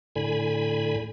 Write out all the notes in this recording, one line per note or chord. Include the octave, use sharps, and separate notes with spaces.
A2 D3 G#5 B5